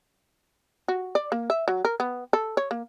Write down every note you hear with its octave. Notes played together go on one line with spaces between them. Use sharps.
F#4
D5
A#3
E5
F#3
A#4
B3
A4
C#5
A#3